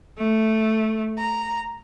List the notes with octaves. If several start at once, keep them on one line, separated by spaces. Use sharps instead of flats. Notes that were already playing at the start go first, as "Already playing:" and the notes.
A3
A#5